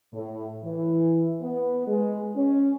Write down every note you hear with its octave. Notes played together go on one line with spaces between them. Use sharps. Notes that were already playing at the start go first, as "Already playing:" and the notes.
A2
E3
B3
G#3
C#4